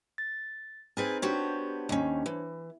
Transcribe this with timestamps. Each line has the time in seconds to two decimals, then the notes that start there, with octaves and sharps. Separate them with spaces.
0.18 A6
0.97 C4 D#4 G#4 B4 C5 G#5
1.22 B3 D4 F#4 G4 C5 C#5
1.89 D#2 C#4
2.26 E3